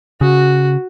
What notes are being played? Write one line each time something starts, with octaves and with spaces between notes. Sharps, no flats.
C#3 F#4